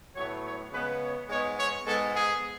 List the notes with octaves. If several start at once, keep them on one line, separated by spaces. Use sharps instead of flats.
A2 F#3 B3 C#5
C#5
C#3 G#3 B3 B4
C#5
G#2 G#3 B3 C#5
C#5
G#2 G#3 B3 A4
G#4